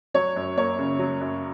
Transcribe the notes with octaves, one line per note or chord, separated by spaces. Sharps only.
F#3 C#5
F#2
A#3 C#5
C#3
F#3
F#2